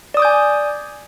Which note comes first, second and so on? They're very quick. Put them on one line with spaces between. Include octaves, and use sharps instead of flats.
D5 D#6 D6 G6 G#5